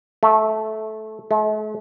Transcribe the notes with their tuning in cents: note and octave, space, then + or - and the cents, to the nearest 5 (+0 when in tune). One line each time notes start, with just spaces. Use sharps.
A3 -15
A3 -45